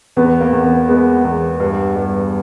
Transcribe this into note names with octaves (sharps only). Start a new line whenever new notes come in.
E2 B3
A#3
E2
B3
G#3 B3
E2
G2
G2